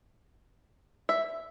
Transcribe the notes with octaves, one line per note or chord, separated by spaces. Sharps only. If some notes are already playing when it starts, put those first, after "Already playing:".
E5